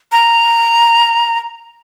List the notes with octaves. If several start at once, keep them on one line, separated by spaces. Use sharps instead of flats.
A#5